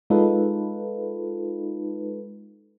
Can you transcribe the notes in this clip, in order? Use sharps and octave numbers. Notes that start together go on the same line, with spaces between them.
G#3 D#4 F4 A4 B4